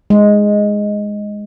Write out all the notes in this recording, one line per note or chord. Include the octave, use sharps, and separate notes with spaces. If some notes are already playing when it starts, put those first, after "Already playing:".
G#3